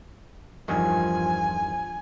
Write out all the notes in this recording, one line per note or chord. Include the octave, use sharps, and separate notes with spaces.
E2 G2 D#3 F3 G#5